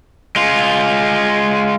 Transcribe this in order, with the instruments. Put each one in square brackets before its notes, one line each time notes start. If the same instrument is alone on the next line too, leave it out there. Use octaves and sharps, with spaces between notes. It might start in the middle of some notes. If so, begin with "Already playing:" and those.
[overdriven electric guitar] G#3 F4